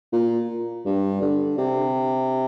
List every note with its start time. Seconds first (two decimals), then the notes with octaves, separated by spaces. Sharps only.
0.13 A#2
0.86 G2
1.22 D3
1.58 C3